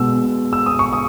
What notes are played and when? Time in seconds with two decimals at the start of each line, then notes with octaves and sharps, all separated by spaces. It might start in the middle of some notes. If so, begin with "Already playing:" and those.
Already playing: B2 G#3 B3 E6
0.53 E6
0.66 D#6
0.79 C#6
0.93 D#6